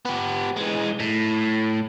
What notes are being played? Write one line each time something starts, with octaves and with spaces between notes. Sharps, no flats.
B3 G4
E3 G#3
A2